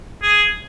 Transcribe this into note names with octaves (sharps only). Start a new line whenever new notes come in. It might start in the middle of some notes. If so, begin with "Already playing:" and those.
G#4